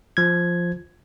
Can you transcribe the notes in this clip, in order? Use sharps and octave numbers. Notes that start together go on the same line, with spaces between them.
F3 G#6